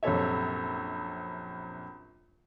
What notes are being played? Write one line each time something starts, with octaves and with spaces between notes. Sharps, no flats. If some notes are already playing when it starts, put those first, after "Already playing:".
A#1 F#2 C3 A4 C#5 E5